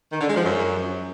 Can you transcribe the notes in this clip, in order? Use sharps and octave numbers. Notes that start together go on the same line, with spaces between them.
D#3
D3
G#3
F3
F#2